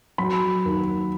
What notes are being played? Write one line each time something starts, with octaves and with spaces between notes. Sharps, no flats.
F#3 B5
D#2